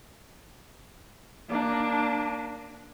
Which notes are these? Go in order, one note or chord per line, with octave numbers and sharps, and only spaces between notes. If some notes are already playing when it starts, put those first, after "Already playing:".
A#3 D4